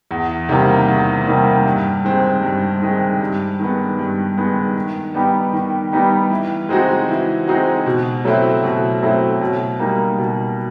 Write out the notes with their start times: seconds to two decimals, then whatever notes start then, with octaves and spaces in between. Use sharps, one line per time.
0.11 E2
0.49 C3 D#3 G3 A#3
0.88 E2
1.27 C3 D#3 G3 A#3
1.66 G2
2.04 D#3 G#3 C4
2.43 G2
2.82 D#3 G#3 C4
3.21 G2
3.59 D#3 G#3 B3
3.99 G2
4.37 D#3 G#3 B3
4.76 D#3
5.15 G3 B3 D#4 G4
5.53 D#3
5.92 G3 B3 D#4 G4
6.30 E3
6.69 G#3 C4 D#4 F#4
7.09 E3
7.47 G#3 C4 D#4 F#4
7.86 B2
8.25 F#3 A3 C4 E4
8.64 B2
9.02 F#3 A3 C4 E4
9.41 B2
9.79 G3 A#3 D#4
10.18 B2